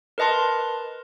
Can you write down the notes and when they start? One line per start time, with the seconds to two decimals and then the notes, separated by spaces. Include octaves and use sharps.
0.18 A#4 B4 D#5 A5 C6